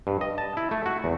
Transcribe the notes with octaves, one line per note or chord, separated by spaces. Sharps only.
G2
D#5
A5
E4
A3
F#4
E2